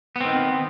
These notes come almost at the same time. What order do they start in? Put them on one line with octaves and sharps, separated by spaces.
B3 C4 D#3